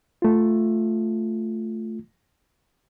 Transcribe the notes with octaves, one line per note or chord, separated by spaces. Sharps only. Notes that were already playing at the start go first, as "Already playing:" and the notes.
A3 F4